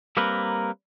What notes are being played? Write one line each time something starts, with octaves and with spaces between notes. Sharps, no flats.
G3 A#3 C4 A#4 B4